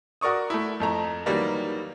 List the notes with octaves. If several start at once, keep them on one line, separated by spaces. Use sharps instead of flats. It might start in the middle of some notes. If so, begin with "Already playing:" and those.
F#4 A#4 D5 C#6 D#6
A3 E4
F2 A3 A#5
D#3 E3 F#3 G3 A#3